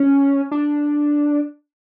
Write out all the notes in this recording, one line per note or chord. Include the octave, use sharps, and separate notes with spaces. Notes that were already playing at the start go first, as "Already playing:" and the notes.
Already playing: C#4
D4